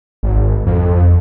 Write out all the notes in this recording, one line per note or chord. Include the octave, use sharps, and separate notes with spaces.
G#1
F2